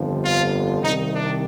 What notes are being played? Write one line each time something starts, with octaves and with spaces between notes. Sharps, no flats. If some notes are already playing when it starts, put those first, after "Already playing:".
Already playing: G1 F2 D3 F3
F4
C2 C3 D#3 D#4
D4